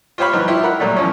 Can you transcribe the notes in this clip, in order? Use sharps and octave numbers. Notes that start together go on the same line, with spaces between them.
F4 G4 C5 C#5 F5 B5
E3 F#3 D#4 F4
E4 F4 G4
A#4 F#5 B5
A#2 F#3 G3 A3
E2 F3 C#4